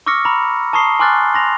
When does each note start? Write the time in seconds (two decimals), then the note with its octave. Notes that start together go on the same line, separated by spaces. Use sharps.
0.06 C#6 D6 E6 F6 A#6 C#7
0.25 A#5 B5
0.73 A5 A#5 C#6 D#6 C7 G7
0.99 G#5 C6 D6 F6 F#6 A6
1.34 C6 A#6 F7